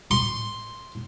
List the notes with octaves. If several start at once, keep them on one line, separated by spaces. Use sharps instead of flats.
C6